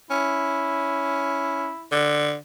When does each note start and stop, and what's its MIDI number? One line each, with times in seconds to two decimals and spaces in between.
0.11 1.73 61
0.11 1.89 64
1.92 2.36 50